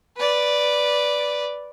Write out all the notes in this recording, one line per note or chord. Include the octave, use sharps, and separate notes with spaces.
B4 D5